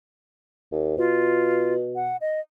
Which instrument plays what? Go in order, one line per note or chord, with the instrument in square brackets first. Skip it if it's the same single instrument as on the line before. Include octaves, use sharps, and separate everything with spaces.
[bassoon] D#2
[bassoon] B2 [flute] F4
[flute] F#5
D#5